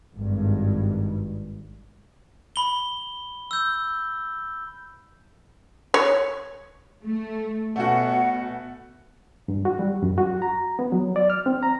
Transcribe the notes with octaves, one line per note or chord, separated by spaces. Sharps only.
G#1 G2
B5 G7
E6 G6
C#5
A3
B2 A3 C#4 F#4 F#5
G2
F#4
G3
F#2
F#4
A#5
B3
F#3
D5
F6
C4
A#5